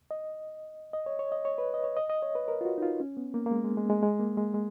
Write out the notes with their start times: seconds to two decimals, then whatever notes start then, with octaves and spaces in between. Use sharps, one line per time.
0.11 D#5
0.93 D#5
1.06 C#5
1.19 C#5
1.32 D#5
1.45 C#5
1.58 B4
1.74 D#5
1.84 C#5
1.97 D#5
2.10 D#5
2.23 C#5
2.35 B4
2.48 A#4
2.61 F4
2.65 F#4
2.78 D#4
2.82 F4
3.00 C#4
3.17 B3
3.34 A#3
3.46 A#3
3.51 G#3
3.64 G#3
3.77 G#3
3.90 G#3
4.03 G#3
4.20 A#3
4.37 G#3
4.54 G#3